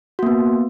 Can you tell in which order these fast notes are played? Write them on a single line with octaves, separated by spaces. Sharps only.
F#4 A#3 B3